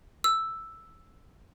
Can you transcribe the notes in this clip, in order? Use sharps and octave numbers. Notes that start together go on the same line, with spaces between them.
E6